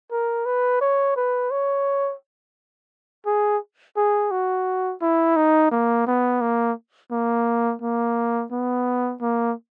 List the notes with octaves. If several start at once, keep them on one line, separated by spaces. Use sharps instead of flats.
A#4
B4
C#5
B4
C#5
G#4
G#4
F#4
E4
D#4
A#3
B3
A#3
A#3
A#3
B3
A#3